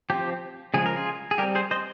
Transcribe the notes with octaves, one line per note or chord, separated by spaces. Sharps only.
F3 C4 G4
C#3 F3 G#3 G#4
A#4
F4 G#4
G#4
G3 G4 A#4
C4
G#4 C5
C5 D#5